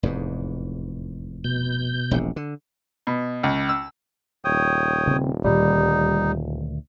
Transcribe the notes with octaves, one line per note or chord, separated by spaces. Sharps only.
F1 E2 G#2
B2 G6
E1 A#1 C3
D3
B2
C#2
E6
D#1 C#5 G5 D#6
C#3 C4
D2 A#2 D#3 G3 D#4